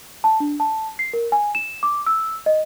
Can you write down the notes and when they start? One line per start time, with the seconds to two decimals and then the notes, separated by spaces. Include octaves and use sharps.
0.24 A5
0.40 D4
0.60 A5
0.99 C7
1.13 A#4
1.32 G#5
1.55 E7
1.83 D6
2.06 E6
2.46 D#5